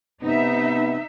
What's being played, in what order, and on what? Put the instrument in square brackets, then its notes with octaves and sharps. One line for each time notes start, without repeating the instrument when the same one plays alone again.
[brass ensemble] C3 B3 [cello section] D#4 E5